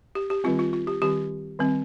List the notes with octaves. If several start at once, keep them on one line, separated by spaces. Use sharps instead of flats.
G4
G4
D#3 G3 C4 F4
F4
F4
G4
D#3 G3 C4 G4
D#3 G3 C4